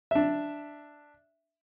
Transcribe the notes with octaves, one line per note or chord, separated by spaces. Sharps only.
D4 E5